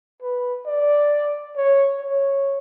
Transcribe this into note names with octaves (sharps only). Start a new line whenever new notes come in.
B4
D5
C#5
C#5